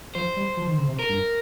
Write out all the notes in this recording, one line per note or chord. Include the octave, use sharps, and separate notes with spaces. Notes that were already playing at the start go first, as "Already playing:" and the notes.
F3 C5
G3
F3
D#3
C#3
C3
A#4
G2